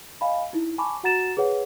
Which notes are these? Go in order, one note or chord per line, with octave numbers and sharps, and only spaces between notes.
D#5 F5 G#5 B5
D#4 E4
G#5 A5 B5 C#6 D6
F#4 F#5 A#5 A6 E7
G#4 B4 C#5 F#5